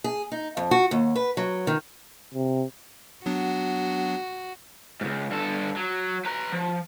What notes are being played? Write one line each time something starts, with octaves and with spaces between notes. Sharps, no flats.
G#4
D#4
F2
F#4
D#2
B4
F#3
D#3
C3
F#3 B3 D4 F#4
C#2 G#2
G2 A4
F#3
B4 A#5
F3